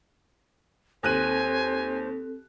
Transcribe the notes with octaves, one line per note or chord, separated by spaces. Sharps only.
D#2 C4 A4 C5 G#5 F#6 D#7